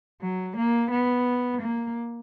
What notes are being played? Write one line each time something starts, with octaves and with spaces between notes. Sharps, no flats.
F#3
A#3
B3
A#3